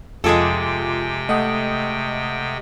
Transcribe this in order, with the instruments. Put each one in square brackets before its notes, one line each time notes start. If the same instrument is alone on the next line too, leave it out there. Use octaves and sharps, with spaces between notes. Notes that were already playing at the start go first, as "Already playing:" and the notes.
[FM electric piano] F2 F4 D6 [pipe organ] C3 G5 [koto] G#3 G#4 A4
[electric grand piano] A3 F#5 [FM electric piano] D#5 D#6